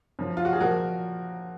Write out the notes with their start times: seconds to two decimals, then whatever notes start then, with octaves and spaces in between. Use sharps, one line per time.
0.19 F#2 F3
0.37 F4
0.45 F#4
0.53 G#4
0.60 A#2 F3 F#4 A#4